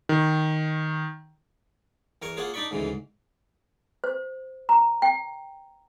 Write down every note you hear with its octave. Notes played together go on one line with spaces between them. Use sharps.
D#3
E2 A#4 G#5 C#6
A#3 F4 G#4 C#5 F#5
D4 D#4 D5 B5 C#6
D2 G#2 C#3 E3
C5
A#5
G5